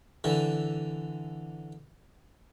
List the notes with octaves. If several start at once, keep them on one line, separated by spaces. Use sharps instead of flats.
D3 E3